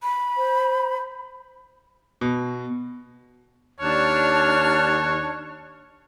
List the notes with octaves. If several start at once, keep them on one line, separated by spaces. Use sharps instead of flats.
B5
C5
B2
D#2 D4 C#5 A5 F6 F#6